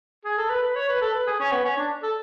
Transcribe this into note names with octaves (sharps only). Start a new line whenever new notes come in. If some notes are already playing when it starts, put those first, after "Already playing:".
G#4
A4
B4
B4
C#5
B4
A4
B4
G#4
C#4
B3
C#4
D4
A4